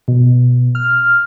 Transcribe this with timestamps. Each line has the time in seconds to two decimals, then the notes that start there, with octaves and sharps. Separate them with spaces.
0.08 B2
0.75 F6